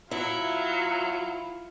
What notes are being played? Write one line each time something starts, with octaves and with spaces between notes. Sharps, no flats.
F#3 E4 F4